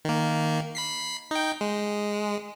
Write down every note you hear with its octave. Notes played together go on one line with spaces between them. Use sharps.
D#3 A#3
B5 B6 C7
D#4 G5
G#3